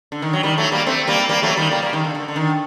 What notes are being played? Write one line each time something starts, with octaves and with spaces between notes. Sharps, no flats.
D3
D#3
F#3
D#3 G3
F#3 A3
G3 A#3
A3 C4
G3 A#3
G3 A#3
F#3 A3
D#3 G3
G3 A#3
G3 A#3
D#3
D3
D3
D3
D#3